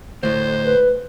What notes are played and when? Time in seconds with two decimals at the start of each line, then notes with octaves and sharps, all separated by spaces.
0.23 D2 A2 C5
0.64 B4